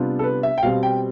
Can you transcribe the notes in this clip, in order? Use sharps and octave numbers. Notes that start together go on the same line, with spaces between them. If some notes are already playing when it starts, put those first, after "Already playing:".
Already playing: C3 G3 B3 D4 F4
A4
B4
E5
G5
B2 G3 C4 F5
G5